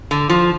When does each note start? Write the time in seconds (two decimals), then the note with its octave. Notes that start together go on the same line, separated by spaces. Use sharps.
0.11 D3
0.30 F3